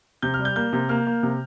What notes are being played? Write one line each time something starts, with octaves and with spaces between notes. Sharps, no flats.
C3 G6
F6
G3
G6
A#3 G6
C3
A#3 F6
A#3
C3